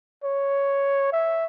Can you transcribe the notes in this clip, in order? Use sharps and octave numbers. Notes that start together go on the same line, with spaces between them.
C#5
E5